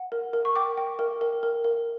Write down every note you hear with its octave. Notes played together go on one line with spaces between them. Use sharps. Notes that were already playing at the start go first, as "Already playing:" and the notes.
Already playing: F#5
A#4
A#4
C#6
G5 D6
G5
A#4
A#4
A#4
A#4